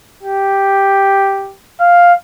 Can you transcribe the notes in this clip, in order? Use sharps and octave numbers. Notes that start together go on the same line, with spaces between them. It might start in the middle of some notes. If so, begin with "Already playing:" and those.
G4
F5